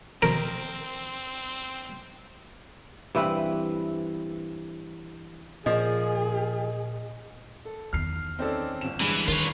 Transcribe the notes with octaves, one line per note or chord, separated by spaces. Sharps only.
B2 D#3 F3 C4 A#4
G2 E3 C4 B4
A#2 F3 G#4 D#5
A4
E2 D#3 F6 C7
C4 C#4 D#4 A4 D5
G1 E7
G2 E3 G#3
D#3 F4 B4 C#5